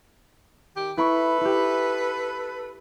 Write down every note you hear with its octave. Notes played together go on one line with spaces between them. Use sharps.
D#3 G4
E4 A4 B4 B5 C#6
E4 G4